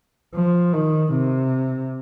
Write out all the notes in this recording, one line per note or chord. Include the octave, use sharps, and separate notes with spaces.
F3
D#3
C3